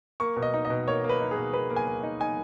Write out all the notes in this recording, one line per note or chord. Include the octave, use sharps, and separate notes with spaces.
A#3 C#6
B2
D#5
D#4
D#5
B2
A#3 C#5
A#3
B4
D#4
G#4
B2
A#3 B4
A#3
G#5
A#3
D#4
D#4 G#5